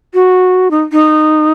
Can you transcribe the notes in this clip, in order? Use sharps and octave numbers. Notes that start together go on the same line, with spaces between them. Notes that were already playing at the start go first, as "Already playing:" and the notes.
F#4
D#4
D#4